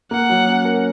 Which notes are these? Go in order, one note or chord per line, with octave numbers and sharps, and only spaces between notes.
A#3 F#5
F#3
C#4
A#4